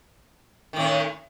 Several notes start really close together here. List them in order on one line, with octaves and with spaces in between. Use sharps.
D#3 A2 C#4